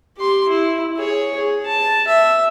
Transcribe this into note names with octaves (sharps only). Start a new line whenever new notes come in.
G4 C6
E4
G#4 C#5
G#4
A5
E5